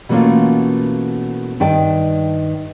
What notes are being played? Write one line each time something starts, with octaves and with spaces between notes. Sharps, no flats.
B2 E3 A3 A#3 C#4 F4
G2 D#3 E5 G5 A5